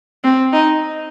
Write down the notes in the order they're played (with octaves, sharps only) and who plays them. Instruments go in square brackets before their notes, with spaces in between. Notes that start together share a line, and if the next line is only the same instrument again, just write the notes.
[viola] C4
D#4